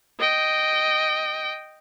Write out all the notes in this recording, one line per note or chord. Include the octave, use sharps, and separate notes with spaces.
D#5 G5